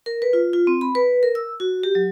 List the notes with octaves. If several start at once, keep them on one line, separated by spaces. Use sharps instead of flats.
A#4
B4
F4
F4
C4
B5
B4
A#4
E6
F#4
G4
F#3